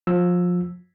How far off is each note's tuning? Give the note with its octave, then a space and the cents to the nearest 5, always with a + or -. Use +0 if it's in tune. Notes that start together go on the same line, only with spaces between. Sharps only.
F3 +25 E6 +0